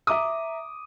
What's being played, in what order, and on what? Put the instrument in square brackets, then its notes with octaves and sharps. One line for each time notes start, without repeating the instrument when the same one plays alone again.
[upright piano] E5 A#5 D6 D#6